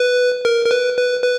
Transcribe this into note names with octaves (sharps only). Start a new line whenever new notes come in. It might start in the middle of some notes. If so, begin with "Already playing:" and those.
Already playing: B4
A#4
A#4
B4
B4
B4